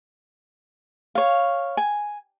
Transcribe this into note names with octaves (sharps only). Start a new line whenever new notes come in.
C#5 F5
G#5